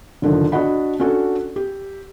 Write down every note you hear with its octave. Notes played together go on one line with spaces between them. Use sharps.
F#1 D3 D#3 F3
D4 F#4 D#5 F#5 B5
C#4 D4 F#4 A4
G4